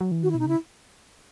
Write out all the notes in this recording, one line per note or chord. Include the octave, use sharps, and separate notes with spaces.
F#3
E3
D#3 F#4
E4
B2 D#4
C#3 E4